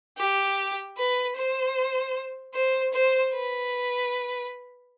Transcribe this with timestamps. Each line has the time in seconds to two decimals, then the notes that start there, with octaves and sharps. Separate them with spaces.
0.17 G4
0.97 B4
1.36 C5
2.54 C5
2.93 C5
3.33 B4